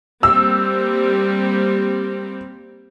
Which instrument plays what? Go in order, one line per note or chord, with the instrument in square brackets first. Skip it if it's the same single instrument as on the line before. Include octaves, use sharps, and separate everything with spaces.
[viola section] G3 A#3 C4 [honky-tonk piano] E6